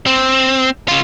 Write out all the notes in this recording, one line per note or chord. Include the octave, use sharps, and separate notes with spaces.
C4
C#3 F4